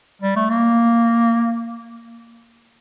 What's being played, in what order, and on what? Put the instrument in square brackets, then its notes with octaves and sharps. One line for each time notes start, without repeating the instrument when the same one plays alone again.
[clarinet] G3
A3
A#3